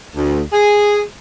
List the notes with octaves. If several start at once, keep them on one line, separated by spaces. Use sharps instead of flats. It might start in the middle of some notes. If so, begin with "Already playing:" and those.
D2
G#4